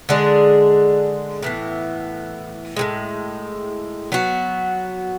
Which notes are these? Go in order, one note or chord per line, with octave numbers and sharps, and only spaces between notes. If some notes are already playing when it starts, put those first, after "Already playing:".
D3 G#3 D4 G#4
A2 E3 B3
A2 E3 G#3
F#3 B3 F#4